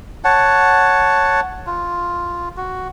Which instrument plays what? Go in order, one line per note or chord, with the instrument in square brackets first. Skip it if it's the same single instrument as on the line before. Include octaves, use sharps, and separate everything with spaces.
[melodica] C#5 F#5 A5
F4
F#4